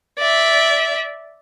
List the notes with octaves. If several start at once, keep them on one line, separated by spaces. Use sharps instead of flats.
D5 E5